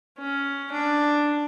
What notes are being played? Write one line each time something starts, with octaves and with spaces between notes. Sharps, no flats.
C#4
D4